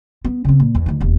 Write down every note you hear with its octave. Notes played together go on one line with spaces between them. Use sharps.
B3
C#3 C4
A#2
E2
D2 D#3
E1 D#2